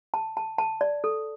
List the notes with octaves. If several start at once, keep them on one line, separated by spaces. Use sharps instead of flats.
A5
A5
A5
D5
A4